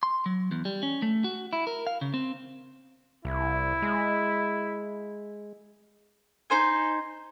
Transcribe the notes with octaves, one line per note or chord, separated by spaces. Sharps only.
C6
F#3
E2
G3
C#4
A3
F#4
E4
A#4
F5
C#3
C4
C2 E4
G#3
D#4 C5 G#5